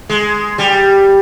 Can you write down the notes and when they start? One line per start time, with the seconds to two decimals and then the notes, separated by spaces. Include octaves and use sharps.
0.09 G#3
0.58 G3